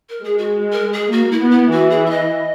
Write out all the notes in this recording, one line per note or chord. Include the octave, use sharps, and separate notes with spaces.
A#4
G#3 G#4
F#4
A#4
G#4
A#3 F#4
E4
B3
E4
E3 F#4
G#4
E5
D#5